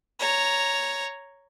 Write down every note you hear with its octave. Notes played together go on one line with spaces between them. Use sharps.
C#5 A#5